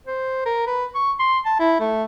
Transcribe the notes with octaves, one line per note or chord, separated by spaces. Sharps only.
C5
A#4
B4
C#6
C6
A5
E4
A3